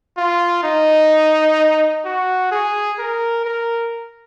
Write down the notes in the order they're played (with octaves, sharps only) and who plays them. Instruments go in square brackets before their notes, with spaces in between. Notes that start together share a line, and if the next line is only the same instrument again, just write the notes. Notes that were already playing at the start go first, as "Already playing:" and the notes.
[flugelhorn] F4
D#4
F#4
G#4
A#4
A#4